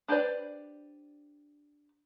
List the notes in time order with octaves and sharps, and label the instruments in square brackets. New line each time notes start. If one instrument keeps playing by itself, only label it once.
[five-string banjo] D4 G4 B4 C5 D5